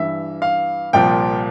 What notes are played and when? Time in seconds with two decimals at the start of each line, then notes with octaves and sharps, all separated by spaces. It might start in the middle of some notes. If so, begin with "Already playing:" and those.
Already playing: G2 E3 E5
0.42 F5
0.93 C2 A#2 F3 G5